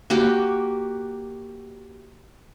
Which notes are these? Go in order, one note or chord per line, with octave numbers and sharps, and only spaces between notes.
A#3 F#4 G4